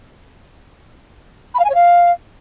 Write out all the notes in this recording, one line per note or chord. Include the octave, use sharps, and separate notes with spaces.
B5
F5
G#5
C#5
F5